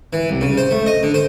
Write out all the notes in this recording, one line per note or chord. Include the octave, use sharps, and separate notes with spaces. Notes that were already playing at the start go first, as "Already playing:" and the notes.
E3
C2
C#3
C5
A3
D#5
D3
C5